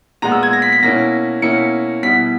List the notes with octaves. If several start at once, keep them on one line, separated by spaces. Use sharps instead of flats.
A#2 G#3 B3 A#5
E6
G#6
A#6
B6
B6
B2 A#3 C#4 E4 A#6
B2 A#3 C#4 E4 C#7
B2 G3 B3 E4 B6